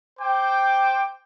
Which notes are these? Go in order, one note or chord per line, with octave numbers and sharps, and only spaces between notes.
C5 G5 D6